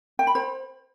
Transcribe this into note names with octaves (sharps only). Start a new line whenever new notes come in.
G5
B5
C5